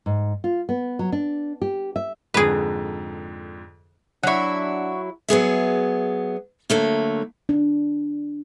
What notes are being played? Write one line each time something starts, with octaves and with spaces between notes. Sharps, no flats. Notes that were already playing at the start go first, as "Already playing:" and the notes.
G#2
F4
B3
F#3
D4
G4
E5
F2 G#2 D3 G#4 B4
F#3 D4 E4 F#5 C#6
F#3 B3 G#4 E5
D3 F#3 A3 A#3
D4